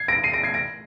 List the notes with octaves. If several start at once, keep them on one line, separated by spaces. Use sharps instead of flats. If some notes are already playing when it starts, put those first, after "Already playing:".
Already playing: G#6 C7
A#6 D7
C7 D#7
A#6 D7
G#6 C7
A#6 D7